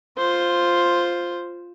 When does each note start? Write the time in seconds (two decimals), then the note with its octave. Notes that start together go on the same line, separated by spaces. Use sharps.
0.18 F4 C5